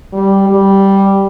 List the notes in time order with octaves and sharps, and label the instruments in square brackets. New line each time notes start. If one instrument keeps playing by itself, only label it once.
[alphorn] G3
G3